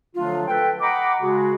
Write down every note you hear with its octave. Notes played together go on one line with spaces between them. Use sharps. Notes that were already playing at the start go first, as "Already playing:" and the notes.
D3 F3 F#3 A3 D4 F4
A4 B4 G5
D#5 F#5 G5 A#5 B5 D6
C#3 G#3 F#4 G#4